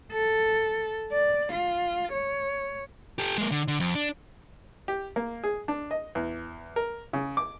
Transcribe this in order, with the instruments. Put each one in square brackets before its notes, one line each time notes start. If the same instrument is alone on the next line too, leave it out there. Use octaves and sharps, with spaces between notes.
[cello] A4
D5
F4
C#5
[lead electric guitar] G4 A4
G#3 A#3
D3
D3
F2
D4
[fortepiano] G4
A#3
G#4
D4
D#5
E2
A#4
C#3
D6